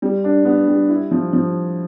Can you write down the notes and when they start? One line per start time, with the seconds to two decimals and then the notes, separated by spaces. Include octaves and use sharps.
0.02 G3
0.24 D4
0.45 B3
0.68 G3
0.89 E4
1.11 F3
1.33 F3